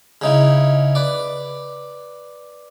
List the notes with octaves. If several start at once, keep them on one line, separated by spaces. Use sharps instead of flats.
C#3 D#4 E4
B4 D5